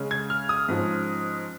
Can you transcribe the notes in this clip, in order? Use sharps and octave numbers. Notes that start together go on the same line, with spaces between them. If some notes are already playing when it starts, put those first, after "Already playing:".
Already playing: C#3 G#3 C#4
G#6
F6
D#6
G#2 F3 C#4